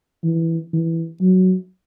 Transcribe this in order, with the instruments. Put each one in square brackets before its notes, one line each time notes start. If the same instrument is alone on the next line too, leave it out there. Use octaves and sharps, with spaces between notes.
[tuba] E3
E3
F#3